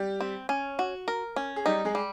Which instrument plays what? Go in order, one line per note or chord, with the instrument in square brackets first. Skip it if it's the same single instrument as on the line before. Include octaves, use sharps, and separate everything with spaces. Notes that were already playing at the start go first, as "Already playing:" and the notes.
Already playing: [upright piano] G3 G4
[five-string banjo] C4
C#4
F#4
A#4
C#4
[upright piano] G#4
[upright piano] G3 G4 [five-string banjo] D#4
[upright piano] G#3 G#4
[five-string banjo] G3